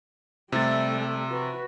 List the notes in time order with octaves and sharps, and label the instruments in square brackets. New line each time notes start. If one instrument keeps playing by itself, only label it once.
[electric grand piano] C3 A6 [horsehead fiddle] G3 A3
[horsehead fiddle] F#4 B4